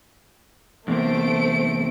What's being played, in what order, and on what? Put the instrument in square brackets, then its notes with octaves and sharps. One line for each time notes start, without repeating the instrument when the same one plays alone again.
[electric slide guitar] E2 C3 A#3 [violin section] A3 C5 D7